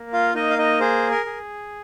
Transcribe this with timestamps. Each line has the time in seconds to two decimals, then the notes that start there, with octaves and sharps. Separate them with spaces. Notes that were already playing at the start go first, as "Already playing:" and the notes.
Already playing: A#3
0.13 F4 F5
0.35 A#3 D#4 D#5
0.50 F5
0.58 D#4 D#5
0.80 G#4 C5
1.11 A#4
1.26 G#4